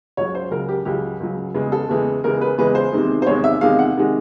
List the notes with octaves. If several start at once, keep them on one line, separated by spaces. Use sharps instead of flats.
C#2 C#3 F#3 C#5
C5
C#2 C#3 F#3 A#4
G4
C#2 C#3 F#3 G4
C#2 C#3 F#3
E2 C#3 E3 G#3
A4
E2 C#3 E3 G#3
E2 C#3 E3 G#3 A#4
B4
E2 C#3 E3 G#3 B4
C5
E2 C3 D#3 G#3
C5
E2 C3 D#3 G#3 C#5
E5
E2 C3 D#3 G#3 F5
F#5
C3 D#3 G#3